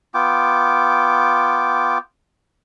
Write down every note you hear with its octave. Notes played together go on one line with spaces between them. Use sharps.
B3 F4 G5 D6